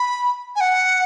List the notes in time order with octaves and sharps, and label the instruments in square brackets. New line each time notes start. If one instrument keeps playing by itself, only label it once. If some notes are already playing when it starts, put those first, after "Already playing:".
Already playing: [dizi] B5
G#5
F#5